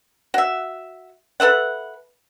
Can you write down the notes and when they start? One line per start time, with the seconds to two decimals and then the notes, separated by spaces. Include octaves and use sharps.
0.34 F#4 E5
1.40 A4 B4 E5 F#5